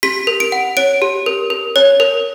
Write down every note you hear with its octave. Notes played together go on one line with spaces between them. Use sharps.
G4 B6
A#4
D7
F#5
C#5 D7
G4
A#4
A#4
C#5
A#4